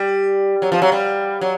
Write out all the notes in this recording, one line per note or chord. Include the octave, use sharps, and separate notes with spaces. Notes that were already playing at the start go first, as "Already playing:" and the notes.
Already playing: G3
F#3
F3
F#3
G3
F#3